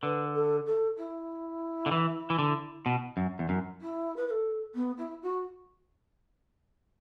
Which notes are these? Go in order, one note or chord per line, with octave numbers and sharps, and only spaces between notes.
D3 B4
A4
A4
E4
D3
E3
E3
D3
B2
F#2
E2
F#2
E4
B4
B4
A4
B3
E4
F#4